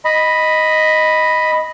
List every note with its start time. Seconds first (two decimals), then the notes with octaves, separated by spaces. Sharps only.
0.05 D#5 B5